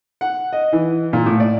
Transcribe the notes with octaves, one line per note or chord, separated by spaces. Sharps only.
F#5
D#5
E3
A#2
A2
D5